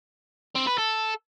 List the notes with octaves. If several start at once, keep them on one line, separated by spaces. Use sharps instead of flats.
C4
B4
A4